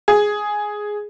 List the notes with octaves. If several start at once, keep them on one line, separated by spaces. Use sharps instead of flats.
G#4